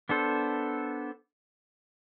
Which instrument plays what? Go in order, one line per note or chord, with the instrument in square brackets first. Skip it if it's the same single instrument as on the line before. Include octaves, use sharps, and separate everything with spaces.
[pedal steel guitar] B3 D4 A4 C5